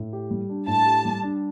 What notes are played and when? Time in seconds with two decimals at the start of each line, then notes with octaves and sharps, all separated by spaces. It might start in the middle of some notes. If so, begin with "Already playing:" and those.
Already playing: A2
0.13 G4
0.31 G3
0.49 D4
0.67 A2 A5
0.86 G4
1.05 G3
1.23 D4